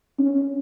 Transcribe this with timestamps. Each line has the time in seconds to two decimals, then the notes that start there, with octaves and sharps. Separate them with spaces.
0.19 C#4